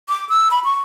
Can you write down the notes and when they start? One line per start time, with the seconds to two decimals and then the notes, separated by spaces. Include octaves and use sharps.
0.09 D6
0.29 E6
0.51 B5
0.64 C#6